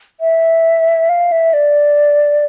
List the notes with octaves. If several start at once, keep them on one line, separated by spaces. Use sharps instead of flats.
E5
F5
E5
D5